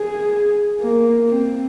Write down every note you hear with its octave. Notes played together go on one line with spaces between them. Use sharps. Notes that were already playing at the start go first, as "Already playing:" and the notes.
Already playing: G#4
A#3
C4